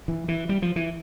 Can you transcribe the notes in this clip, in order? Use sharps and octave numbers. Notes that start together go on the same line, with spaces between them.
E3
E3
G3
F3
E3